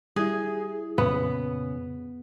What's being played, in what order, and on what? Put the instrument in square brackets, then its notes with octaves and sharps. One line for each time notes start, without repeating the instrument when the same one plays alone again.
[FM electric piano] G3 E4 [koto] G#4
[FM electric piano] F2 A#2 [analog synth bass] C#3 [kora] B3